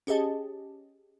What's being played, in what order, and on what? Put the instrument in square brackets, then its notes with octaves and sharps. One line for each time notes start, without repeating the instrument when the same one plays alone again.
[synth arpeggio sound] C#4 G4 G#4 D#5 A5